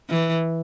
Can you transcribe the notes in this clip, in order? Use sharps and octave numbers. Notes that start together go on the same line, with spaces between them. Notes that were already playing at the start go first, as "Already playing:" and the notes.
E3